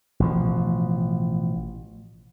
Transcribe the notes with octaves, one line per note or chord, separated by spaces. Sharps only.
A1 B2 F3